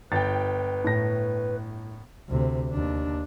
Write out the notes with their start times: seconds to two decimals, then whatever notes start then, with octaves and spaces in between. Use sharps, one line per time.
0.12 G1 B4 G5 A6
0.84 A2 A#6
2.29 D2 C3
2.72 D#2 D4